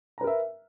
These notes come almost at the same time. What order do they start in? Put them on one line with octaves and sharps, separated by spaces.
A#5 B4 A#4 E5